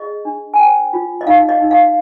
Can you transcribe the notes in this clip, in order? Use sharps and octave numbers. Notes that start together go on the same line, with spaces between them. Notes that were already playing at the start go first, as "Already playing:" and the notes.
Already playing: G#4 D#5
D4
G#5
C5 G5
F4
D#5
D#4 F5
D#5
D#4
F5